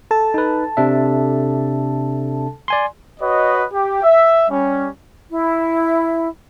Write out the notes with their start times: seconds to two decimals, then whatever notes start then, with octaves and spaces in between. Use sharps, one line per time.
0.11 A4 A5
0.34 D#4 B4
0.77 C3 D4 E5
2.68 D5 G#5 C6
3.20 F#4 B4 C#5 D#5
3.73 G4
4.03 E5
4.49 G3 C#4
5.30 E4